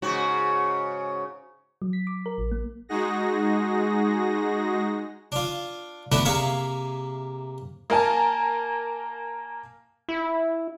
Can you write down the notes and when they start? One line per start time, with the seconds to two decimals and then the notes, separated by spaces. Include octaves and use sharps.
0.02 G#2 C#3 F#4
1.82 F#3
1.93 B6
2.07 D6
2.26 A#4
2.38 A1
2.51 A#3
2.89 G#3 D#4 F#4 G#4 A#6
5.32 D4 F4
6.12 D3 A3 B3 D4 E4 F#4
6.25 C3 A#3 G#4 E5 F5 C#6
7.90 A#3 A#4 G#5 A5
10.09 E4